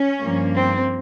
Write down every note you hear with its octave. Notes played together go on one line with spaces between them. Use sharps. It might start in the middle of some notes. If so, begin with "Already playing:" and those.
Already playing: C#4
G2 F3 A#3
C4